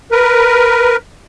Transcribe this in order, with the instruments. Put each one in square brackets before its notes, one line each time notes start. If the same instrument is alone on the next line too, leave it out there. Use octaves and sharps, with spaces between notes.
[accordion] A#4 B4